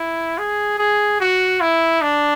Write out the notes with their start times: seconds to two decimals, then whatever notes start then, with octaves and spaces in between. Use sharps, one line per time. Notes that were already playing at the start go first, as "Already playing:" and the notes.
Already playing: E4
0.38 G#4
0.78 G#4
1.20 F#4
1.61 E4
2.02 D4